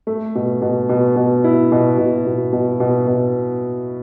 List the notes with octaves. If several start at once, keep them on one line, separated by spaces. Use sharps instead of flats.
A3
B2
B2
B2
B2
E4
B2
B2
B2
B2
B2
B2